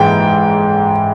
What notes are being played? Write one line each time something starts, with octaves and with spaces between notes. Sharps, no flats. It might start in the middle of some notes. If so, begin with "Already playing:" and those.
Already playing: G#2 E3 G5